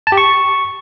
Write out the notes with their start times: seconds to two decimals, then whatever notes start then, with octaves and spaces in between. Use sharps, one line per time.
0.07 A5
0.12 G4
0.17 C#6